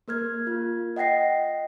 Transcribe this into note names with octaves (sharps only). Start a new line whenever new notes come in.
A#3 A#4 F6 G#6
F4
D#5 F#5 G5 A#6 C7